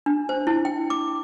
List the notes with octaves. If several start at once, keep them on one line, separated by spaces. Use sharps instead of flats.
D4
C5
E4
G5
D6